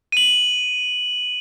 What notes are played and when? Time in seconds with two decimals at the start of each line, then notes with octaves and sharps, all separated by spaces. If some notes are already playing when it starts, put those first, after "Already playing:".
0.12 D#7 F#7